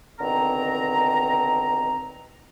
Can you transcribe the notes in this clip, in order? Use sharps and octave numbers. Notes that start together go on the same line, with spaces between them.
C#2 B2 D3 D#3 C4 A#5